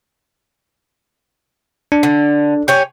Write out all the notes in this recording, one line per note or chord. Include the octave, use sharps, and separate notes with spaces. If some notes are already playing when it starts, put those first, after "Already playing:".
D4
D3
G4 C#5 G#5